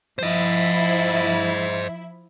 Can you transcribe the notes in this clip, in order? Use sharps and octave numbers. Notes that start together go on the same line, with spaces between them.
F3 E4 C5 D#5